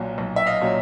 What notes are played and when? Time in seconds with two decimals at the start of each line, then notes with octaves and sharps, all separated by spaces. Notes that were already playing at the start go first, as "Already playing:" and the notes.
Already playing: B1 A#2 F#3
0.18 B1
0.36 E5
0.46 D#5 F5
0.61 A#2 F#3